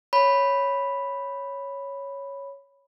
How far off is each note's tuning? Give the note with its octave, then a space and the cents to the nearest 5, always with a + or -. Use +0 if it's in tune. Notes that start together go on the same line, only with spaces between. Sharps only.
C#5 +0 B5 +0